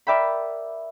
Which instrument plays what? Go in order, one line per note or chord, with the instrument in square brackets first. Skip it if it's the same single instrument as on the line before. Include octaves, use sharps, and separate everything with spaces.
[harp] A#4 D5 E5 G5 B5